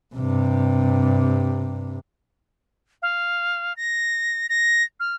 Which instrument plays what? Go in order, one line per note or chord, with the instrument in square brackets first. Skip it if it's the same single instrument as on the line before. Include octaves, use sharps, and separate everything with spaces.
[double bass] G2 C3
[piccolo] F5
A#6
A#6
F6